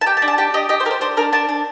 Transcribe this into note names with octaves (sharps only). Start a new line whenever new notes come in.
A5
G4 G5
A5
D4
A5
G4 G5
G4 D#5
G4 D#5
C5
G4 A#4
C5
D4 C5
D4 A#4
D4 A5
D4